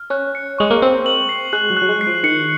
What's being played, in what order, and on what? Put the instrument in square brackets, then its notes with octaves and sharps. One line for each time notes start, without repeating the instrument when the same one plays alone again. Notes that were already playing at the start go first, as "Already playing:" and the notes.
Already playing: [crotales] F6
[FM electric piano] C#4 [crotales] F#6
[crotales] C#7
[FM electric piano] G#3 [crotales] C#6
[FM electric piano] A#3
[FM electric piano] C4 [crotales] F#6
[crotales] F#7
C7
[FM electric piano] G#3 [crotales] F#6
[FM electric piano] F#3
[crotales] F#6
[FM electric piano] F#3
G#3
[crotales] C7
[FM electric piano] F3
[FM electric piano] D#3 [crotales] C#7